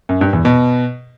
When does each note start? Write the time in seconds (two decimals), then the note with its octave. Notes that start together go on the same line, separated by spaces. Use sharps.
0.09 F#2
0.21 G2
0.33 E2
0.45 B2